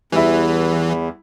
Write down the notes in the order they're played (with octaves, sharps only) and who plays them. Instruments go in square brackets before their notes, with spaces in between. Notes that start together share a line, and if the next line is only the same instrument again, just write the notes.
[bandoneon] E2 [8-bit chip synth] E3 [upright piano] G3 E4